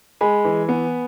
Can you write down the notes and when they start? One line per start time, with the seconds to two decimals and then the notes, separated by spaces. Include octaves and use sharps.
0.21 G#3 G#5 B5
0.45 E3
0.69 B3